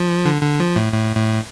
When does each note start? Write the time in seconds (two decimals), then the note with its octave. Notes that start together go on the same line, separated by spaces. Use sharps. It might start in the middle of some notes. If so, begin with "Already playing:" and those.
Already playing: F3
0.25 D3
0.42 D3
0.60 F3
0.76 A2
0.93 A2
1.16 A2